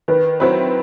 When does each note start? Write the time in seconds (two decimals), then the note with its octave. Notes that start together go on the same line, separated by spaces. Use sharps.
0.08 D#3 B4
0.40 F#3 C4 E4 B4 C5